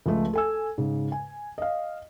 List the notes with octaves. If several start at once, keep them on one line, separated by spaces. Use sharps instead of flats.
C#2 F3 A3
A4 G#5 E6
G#2 C#3
G#5
D#5 F5